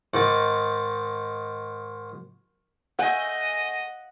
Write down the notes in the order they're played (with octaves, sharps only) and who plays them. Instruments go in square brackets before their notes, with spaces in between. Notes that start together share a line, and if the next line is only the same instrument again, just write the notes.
[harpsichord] G#2 D#3 A5
[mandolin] A3 G#5 G6 [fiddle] D#5 [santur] F#5